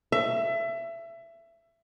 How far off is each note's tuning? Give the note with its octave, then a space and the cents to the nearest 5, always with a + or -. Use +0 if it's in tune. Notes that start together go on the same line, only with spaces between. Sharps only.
E5 +25